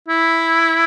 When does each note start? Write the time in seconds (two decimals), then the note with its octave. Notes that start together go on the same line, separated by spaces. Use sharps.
0.08 E4